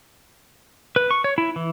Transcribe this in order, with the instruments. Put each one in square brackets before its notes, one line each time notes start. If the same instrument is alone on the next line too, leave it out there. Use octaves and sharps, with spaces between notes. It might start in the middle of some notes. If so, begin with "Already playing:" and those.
[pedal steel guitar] B4
C#6
C#5
E4
E3